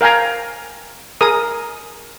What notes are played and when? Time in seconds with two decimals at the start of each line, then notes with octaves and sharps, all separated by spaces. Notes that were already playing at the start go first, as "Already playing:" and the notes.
0.01 A#4 F5 G5 G#5 A#5
1.21 G#4 A#4 D#6